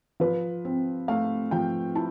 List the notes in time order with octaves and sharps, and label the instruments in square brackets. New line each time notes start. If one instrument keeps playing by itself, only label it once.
[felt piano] F3 B4
C4
A3 F5
F3 G5
E4 A5